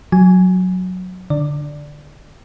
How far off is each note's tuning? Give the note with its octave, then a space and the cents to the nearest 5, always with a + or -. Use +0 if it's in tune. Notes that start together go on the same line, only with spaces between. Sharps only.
F#3 -10 G#5 +0
D3 +0 D5 +0